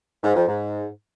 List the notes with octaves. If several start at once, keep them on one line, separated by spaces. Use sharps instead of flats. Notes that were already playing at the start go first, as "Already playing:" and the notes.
G#2
F2
G#2